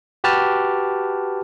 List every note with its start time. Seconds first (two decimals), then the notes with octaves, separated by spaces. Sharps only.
0.24 F#4 G4 B4 A5 F6